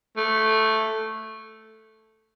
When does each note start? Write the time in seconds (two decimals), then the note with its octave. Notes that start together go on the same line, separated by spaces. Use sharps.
0.17 A3